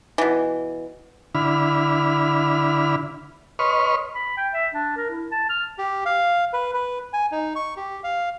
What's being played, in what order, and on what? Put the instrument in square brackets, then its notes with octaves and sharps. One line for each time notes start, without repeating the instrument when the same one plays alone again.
[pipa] B2 E3
[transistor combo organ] D3 E4 B5 F6
B4 C#5 D#5 C6 C#6 F6
[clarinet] B5
G5
E5
D4
A#4
E4
A5
F6
[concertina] G4
F5
B4
B4
G#5
D#4
C#6
G4
F5